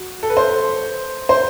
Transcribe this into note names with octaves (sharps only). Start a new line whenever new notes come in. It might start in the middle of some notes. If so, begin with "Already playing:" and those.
Already playing: F#4
A4
B4
C5
C5